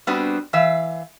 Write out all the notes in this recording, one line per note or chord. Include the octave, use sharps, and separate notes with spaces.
G3 B3 C4 D4 F#4
E3 E5 F5